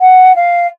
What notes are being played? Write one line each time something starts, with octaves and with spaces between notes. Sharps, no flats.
F#5
F5